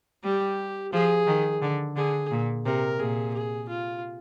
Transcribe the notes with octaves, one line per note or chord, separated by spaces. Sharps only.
G3 G4
F3 G#4
D#3
D3
D3 G#4
A#2
C3 A#4
A#2 G#4
G#4
F4